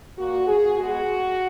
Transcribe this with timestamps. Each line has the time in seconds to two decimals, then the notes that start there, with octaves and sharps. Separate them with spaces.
0.17 A#2 A#3 F#4
0.47 G#4
0.77 B2 G#3 B3 F#4